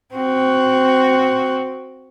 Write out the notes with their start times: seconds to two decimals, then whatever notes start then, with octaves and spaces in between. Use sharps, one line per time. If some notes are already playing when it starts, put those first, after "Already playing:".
0.15 C4 F#4